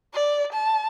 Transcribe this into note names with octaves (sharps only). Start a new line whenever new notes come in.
D5
A5